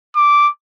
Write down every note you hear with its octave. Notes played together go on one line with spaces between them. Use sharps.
D6